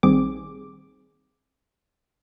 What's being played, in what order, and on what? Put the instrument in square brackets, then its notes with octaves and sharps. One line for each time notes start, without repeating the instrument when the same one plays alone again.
[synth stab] A#1 D#3 G3 C4 G#4 D6